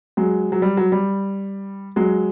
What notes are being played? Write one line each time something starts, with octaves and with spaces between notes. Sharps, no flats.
F#3 G#3
F#3
G3
F#3
G3
F#3 G#3